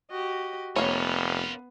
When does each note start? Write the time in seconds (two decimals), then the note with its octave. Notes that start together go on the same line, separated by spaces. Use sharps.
0.11 F#4 G4 D#5
0.76 F1 A#3 B3 C#4 F4 B4 C#5